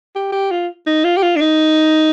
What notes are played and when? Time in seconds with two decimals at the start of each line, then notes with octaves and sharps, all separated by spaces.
0.15 G4
0.32 G4
0.51 F4
0.87 D#4
1.04 F4
1.17 G4
1.23 F4
1.36 D4
1.41 D#4